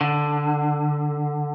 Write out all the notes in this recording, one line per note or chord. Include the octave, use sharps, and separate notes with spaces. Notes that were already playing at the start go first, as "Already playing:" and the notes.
D3